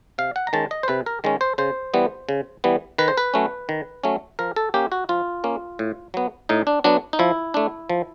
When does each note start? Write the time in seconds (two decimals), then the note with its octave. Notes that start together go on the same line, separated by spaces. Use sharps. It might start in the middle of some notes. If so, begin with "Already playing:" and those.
0.18 C3 F5
0.36 F#5
0.47 A#5
0.53 D#3 G#3 C#4 A5
0.71 D#5
0.83 C5
0.88 C3 B4
1.06 A#4
1.24 D#3 G#3 C#4
1.41 C5
1.58 C#3 C5
1.94 E3 G3 B3
2.29 C#3
2.64 E3 G3 B3
2.98 D#3 B4
3.08 C5
3.17 B4
3.34 F#3 A3 C#4
3.69 D#3
4.04 F#3 A3 C#4
4.39 F3 A#4
4.56 A4
4.74 A#3 C#4 G4
4.92 F#4
5.09 F3 F4
5.44 A#3 C#4
5.79 A2
6.14 F#3 B3
6.49 A2 D#4
6.67 D4
6.84 F#3 B3 D4
7.13 D#4
7.19 F3 E4
7.54 A3 D4
7.90 F3